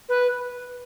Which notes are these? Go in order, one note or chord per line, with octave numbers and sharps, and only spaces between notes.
B4